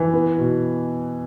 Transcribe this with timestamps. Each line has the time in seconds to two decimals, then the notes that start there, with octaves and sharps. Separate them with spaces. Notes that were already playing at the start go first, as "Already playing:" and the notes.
Already playing: E3
0.13 B3
0.38 B2